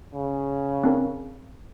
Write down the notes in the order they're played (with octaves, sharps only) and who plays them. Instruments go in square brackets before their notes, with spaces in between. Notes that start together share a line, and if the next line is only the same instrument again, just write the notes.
[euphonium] C#3
[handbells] C4 D4 A#4